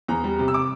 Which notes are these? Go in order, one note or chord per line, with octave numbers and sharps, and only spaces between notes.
E2 A#5
G3
C3
E6
D6